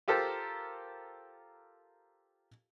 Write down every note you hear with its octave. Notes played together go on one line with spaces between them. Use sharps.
F4 G4 A4 A#4 C5 A#5